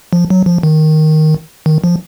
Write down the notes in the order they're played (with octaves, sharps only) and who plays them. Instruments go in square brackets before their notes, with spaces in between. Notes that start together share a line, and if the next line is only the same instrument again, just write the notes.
[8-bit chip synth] F3
F#3
F3
D#3
D#3
F3